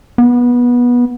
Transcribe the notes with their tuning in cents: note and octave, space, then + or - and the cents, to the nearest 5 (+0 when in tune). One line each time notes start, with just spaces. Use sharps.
B3 -20